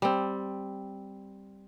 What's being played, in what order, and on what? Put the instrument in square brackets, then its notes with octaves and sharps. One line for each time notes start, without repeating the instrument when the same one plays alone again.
[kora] G3 C4